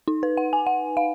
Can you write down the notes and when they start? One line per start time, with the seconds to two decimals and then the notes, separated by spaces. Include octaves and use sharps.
0.08 D#4
0.23 B4
0.37 F#5
0.53 G#5
0.67 F#5
0.97 F5